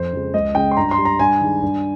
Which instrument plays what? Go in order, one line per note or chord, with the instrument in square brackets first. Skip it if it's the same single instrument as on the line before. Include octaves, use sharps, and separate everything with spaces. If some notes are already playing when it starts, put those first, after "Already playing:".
Already playing: [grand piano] F2 C5
C#3 F3 G#3
C#2 D#5
C#3 G#3 G5
C6
G2 A#5
C6
G3
A#5
G2 G#5
D#3 G#3
G2